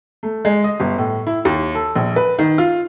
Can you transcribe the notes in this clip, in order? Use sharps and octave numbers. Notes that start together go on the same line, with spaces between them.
A3
G#3
D#5
G1
A2
E4
D#2
A4
A#1
B4
D#3
F4